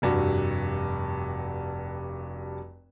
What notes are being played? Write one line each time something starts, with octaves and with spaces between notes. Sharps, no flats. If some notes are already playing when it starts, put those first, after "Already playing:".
F1 G2 F#4